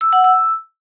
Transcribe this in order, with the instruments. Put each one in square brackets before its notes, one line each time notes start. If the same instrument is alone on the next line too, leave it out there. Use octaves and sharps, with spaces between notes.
[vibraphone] E6
F#5
E6